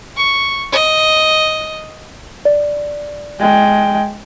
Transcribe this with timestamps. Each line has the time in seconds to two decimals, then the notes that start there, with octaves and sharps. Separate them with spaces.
0.17 C#6
0.72 D#5
2.45 D5
3.40 G#3 G5